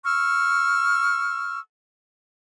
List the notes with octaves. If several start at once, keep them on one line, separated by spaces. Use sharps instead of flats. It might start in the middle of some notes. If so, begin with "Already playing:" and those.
C#6 E6 F6